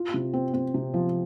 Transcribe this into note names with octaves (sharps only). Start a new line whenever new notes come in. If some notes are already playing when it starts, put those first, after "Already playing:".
Already playing: F4
C3
C4
C4
C3
F3